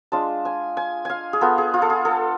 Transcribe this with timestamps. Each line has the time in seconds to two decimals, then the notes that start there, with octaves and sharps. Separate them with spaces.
0.12 G#3 D4 F4 A5
0.45 G#5
0.77 G#5
1.05 F5 G#5
1.33 G#4
1.41 B3 F4 A4
1.58 G#4
1.74 F4
1.82 A4
1.90 G#4
2.05 A4